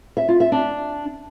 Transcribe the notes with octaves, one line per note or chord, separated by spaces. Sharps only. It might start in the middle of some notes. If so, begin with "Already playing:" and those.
E5
F4
E5
D4